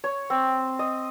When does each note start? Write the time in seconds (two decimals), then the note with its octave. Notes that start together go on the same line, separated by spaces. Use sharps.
0.04 C#5
0.30 C4
0.79 D#5